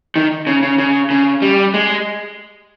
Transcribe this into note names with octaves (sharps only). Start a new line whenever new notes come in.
D#3
C#3
C#3
C#3
C#3
G3
G#3